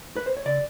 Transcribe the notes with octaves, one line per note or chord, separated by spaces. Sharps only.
B4
C5
C#5
C#3 D5